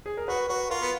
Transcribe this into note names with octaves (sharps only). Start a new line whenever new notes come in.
G#4
A#4
F#4 B4
F#4 B4
F4 A#4
B3